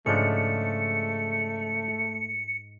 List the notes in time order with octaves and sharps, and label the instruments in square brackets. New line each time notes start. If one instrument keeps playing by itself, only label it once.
[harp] G#2 G6 [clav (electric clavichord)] C#3 F3 D4 [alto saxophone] A3 [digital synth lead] C#7